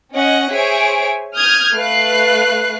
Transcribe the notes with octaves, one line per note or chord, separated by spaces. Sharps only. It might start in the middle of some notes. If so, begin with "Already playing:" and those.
C#4 D#5 F#5
G#4 C5 C#5 E5 G#5 D7
D#6 F6 G6 G#6
A3 B4 F5 F#6 C7